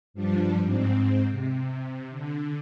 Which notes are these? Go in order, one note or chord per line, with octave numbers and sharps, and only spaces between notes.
G2 F3 G3 D4
G#2 C4
C3
D3